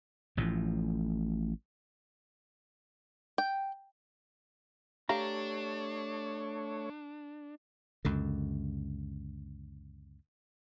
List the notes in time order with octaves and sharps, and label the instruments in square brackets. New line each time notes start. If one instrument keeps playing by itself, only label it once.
[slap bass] A1 A2 F3
[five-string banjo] G5
[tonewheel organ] A3 C#5 [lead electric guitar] D4 [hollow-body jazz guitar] G4 F5 A#5
[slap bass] C#2 F#2 D3